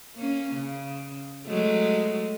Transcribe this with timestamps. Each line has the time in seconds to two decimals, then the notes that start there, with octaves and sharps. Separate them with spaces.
0.15 A#3 C#4
0.54 C#3
1.46 F#3 G#3 A3